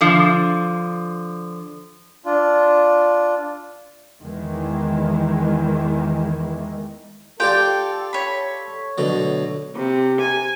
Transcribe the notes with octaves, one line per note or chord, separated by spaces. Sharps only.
D3 F3
D4 F4
E2 D#3 E3 G#3
F4 G4 A4 D5 G5
C#5 B5
B2 D3 F#3 A3
C3
G#5